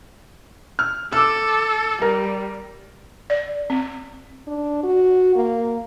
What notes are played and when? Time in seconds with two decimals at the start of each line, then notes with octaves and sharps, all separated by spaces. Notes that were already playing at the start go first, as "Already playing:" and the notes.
0.79 F6
1.13 A4 D6 E6
2.02 G3 A#4
3.30 D5
3.70 C4
4.47 D4
4.83 F#4
5.36 A#3